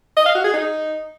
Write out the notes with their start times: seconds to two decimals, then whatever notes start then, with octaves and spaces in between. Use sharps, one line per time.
0.17 D#5
0.26 F5
0.35 F#4
0.44 G#4
0.53 D#4